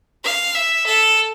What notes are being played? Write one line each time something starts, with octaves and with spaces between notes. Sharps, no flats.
F5
E5
A4